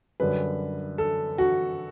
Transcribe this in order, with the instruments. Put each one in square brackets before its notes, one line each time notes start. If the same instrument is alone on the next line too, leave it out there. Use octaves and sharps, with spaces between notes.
[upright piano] F#2 D3 G3 B4
A4
F#4